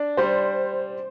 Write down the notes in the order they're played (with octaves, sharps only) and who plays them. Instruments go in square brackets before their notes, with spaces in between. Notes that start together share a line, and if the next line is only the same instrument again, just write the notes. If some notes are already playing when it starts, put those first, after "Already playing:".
Already playing: [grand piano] D4
[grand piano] G3 [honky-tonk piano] C5